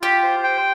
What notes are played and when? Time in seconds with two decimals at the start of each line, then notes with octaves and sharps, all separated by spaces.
0.02 F4 G4
0.23 C5
0.44 G5